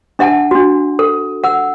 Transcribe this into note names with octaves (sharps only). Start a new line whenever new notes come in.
D4 E5 F#5 G#5 A5
D4 F#4
A4
F#5 E6